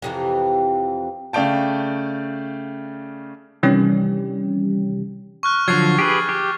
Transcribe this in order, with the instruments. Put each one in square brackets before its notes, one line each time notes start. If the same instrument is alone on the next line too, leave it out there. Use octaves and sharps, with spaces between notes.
[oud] F2 C3 E3
[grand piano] C#3 A3 D5 F5 G5 A5
[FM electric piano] C3 D#3 E3 G3 C#4 G4
[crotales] C#6 F6 F#6
[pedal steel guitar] D3 F3 F#3 [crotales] G#6 A6 C7
[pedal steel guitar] G4 G#4 B4
G4